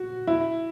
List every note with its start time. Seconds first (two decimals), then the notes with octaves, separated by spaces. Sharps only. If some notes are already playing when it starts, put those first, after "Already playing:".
Already playing: F#4
0.27 E4